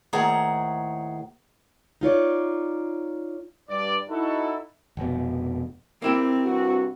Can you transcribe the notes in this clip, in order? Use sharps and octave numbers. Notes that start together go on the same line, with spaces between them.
D#2 A2 G#4 C5 F#5 A#5
D#4 F4 C#5 D5
G2 D5
D#4 E4 F#4 A4
F1 B2
A#3 C4 E4 G4
G2 C3 F#4